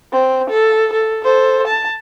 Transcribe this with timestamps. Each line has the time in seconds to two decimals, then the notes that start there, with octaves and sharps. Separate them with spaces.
0.12 C4
0.50 A4
0.93 A4
1.24 A4 C5
1.67 A5